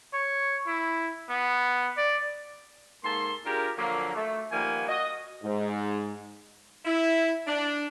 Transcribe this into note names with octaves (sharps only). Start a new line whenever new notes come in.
C#5
E4
B3
D5
G#2 A#3 A4 C6
D4 F4 G4 G#4 A#4
D3 F3 F#3 A#3
A3
D#3 F3 G3 A#3 B3 G#5
F#4 D#5
G#2
E4
D4